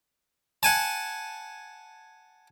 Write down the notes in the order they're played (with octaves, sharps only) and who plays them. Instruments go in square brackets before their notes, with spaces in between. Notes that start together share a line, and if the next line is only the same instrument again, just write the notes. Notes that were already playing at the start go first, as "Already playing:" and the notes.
[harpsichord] F#5 G#5 A5